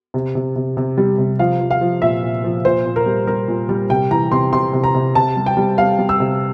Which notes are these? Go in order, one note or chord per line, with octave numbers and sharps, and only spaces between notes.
C3
C3
C3
C3
G3
C3
F3 F5
F3
F5
F3
A#2 E5
A#2
F3
A#2 C5
A#2
A#4
G3
G3 A#4
A#2
G3
C3 G5
E3 A#5
C3 C6
C3 C6
C3
A#5
C3
C3 A5
G3
G5
G3
G3 F5
G3
E6
C3